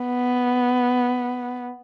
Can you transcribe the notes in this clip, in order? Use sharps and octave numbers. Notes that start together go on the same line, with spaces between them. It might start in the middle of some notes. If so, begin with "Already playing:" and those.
Already playing: B3